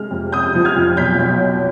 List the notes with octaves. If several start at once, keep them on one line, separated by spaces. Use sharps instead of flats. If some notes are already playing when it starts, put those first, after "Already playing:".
Already playing: C3 G#3 F6
F2
C3 D#6 G6
F3
F6 G#6
F2
B1 G6 B6
B1
B1